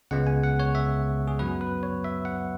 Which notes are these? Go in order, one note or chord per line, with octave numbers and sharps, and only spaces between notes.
C#2 C#3 G#3 B3 F#5
G#5
F#5
C#5
E5
G#4
F#2 F#3 B3 B4
B4
C#5
E5
F#5